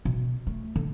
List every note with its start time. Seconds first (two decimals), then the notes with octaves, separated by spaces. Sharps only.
0.05 B2
0.47 A3
0.76 D3